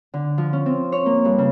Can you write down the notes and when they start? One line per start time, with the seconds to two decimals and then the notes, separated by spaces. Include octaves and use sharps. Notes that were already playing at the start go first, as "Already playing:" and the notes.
0.14 D3
0.38 F3
0.53 C#4
0.66 C4
0.92 C#5
1.06 A#3
1.25 G2
1.38 C#3